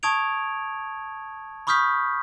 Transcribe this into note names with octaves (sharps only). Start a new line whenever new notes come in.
A5 C#6 D#6 G#6 D7 F7
B5 C#6 D#6 F6 G6 B6